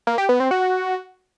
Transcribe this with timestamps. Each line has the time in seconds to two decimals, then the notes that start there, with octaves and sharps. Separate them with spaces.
0.07 A#3
0.18 G4
0.29 B3
0.40 C4
0.51 F#4